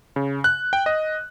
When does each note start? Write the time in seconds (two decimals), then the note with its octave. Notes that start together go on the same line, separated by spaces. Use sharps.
0.16 C#3
0.44 F#6
0.73 G5
0.86 D#5